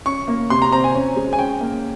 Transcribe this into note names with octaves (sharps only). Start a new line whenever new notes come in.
C#4 C#6
A#3
C3 C6
A#5
C4 A#5
G#5
C#4
G#3
G#5
C#4 G5
A#3